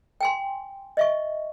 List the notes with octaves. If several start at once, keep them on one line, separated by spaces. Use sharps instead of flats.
G5 G#5 C6
D#5 E5 C#6